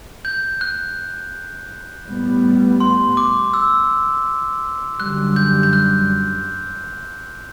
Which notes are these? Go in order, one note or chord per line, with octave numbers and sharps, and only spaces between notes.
G6
F#6
A2 G3 B3
C6
D6
E6
F#2 D3 G3 F#6
G6
G6
F#6